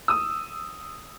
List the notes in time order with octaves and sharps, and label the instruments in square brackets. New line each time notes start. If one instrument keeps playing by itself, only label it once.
[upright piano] D#6 E6